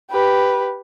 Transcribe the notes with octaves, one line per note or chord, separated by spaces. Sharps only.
G4 B4